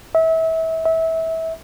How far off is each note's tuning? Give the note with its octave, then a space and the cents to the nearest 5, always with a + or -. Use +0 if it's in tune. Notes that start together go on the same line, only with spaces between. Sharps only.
E5 -30
E5 -25